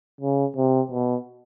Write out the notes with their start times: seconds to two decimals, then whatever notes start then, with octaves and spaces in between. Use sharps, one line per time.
0.21 C#3
0.56 C3
0.91 B2